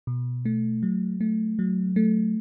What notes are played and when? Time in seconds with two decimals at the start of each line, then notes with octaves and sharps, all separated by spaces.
0.07 B2
0.45 A3
0.83 F#3
1.21 A3
1.59 F#3
1.96 A3